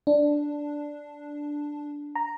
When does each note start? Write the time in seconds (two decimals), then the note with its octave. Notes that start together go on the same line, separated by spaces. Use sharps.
0.07 D4
2.15 A#5